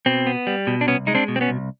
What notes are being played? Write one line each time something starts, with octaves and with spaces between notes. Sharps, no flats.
B2 C4
B3
G3
B2
D4
C2 B3 C#4
G#3 D#4
C4 D4
B2
C4
B3 C#4
C2